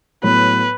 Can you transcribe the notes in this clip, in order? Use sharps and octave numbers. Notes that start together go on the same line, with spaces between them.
A2 F#3 B3 B4